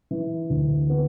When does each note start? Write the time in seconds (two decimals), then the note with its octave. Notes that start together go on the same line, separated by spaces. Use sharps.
0.11 E3
0.50 D2
0.90 B3